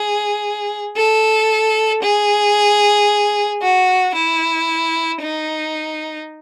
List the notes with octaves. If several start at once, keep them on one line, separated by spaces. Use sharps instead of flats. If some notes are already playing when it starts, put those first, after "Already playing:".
Already playing: G#4
A4
G#4
F#4
E4
D#4